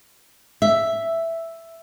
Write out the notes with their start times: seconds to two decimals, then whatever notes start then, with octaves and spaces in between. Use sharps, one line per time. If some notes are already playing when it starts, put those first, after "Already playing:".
0.62 E5